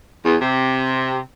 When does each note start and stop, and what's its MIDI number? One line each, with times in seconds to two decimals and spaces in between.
0.25 0.37 40
0.41 1.18 48